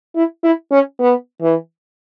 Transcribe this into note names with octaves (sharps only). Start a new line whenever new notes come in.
E4
E4
C#4
B3
E3